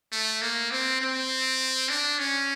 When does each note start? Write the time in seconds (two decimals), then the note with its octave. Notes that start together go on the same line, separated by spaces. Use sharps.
0.12 A3
0.41 A#3
0.71 C4
1.01 C4
1.89 D4
2.19 C#4